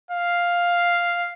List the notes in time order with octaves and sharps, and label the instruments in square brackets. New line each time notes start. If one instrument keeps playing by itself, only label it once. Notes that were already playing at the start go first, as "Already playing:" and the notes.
[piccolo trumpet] F5